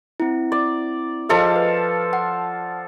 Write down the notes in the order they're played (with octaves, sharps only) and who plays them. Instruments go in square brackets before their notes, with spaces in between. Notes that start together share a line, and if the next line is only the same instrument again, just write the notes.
[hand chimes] C4 E4
[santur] D5
[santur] F3 A4 F5 [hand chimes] G#4 D#5
[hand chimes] B4
F#5